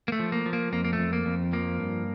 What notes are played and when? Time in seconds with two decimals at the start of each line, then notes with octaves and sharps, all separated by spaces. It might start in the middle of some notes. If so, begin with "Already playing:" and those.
0.08 A#3
0.12 A3
0.19 F3
0.32 A#3
0.46 F3
0.53 A#3
0.73 F2 A#3
0.85 A#3
0.93 A3
0.99 F2
1.13 A#3
1.26 F2
1.53 F3 A#3
1.80 G2